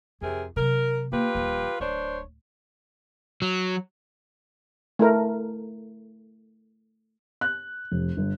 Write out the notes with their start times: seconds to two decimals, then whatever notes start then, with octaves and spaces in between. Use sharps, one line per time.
0.21 F2 C3 G#4 A#4
0.56 C3 F#3 A#4
1.12 A#3 F4 G4 B4
1.35 D#1 F3
1.80 D1 D4 C5 C#5
3.42 F#3
4.99 A3 E4 A#4
7.41 F#6
7.91 F1
8.17 G1